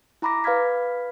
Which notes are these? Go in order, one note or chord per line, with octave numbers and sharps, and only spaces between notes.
E4 A#5 B5 D6 A#6
B4 F5 B5 F6 G#6 B6